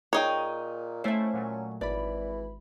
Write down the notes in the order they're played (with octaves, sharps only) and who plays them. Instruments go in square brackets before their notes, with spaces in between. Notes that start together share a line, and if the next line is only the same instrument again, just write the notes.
[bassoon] A#2 [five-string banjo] D#4 C#5 [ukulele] G#4 G5
[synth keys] A3 E4 C5 [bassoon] C#4 [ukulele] E5 F5
[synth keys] A#2 F#3 A3
[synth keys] G#1 B5 [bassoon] E3 [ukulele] D5